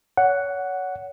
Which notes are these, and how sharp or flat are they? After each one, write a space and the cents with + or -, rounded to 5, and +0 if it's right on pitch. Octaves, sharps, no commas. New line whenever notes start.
C#5 +30 F#5 +0